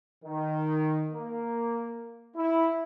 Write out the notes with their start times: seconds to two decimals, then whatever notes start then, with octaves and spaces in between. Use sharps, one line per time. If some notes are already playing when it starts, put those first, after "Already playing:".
0.25 D#3
1.13 A#3
2.37 E4